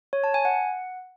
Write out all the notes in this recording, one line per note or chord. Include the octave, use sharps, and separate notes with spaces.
C#5
A5
G#5
F#5